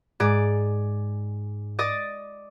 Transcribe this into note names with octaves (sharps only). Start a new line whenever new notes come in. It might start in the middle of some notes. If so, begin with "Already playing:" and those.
G#2 G#4 D5
D5 D#5 D#6 A6